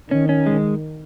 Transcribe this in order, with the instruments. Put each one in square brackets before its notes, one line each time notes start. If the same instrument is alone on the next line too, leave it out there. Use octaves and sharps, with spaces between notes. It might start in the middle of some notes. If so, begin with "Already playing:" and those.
[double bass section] D#3 [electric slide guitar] C#4
[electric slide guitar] C#4
G#3